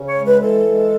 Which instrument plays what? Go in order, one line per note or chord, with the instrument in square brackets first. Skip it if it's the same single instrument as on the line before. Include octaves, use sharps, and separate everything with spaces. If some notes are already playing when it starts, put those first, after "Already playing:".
Already playing: [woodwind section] C#3
C#5
G#3
B4
E3 A4
G#3